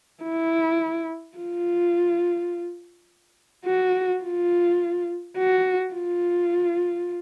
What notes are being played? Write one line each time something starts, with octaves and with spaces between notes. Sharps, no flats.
E4
F4
F#4
F4
F#4
F4